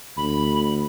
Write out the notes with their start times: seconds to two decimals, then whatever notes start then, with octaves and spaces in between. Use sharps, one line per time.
0.17 D2 B5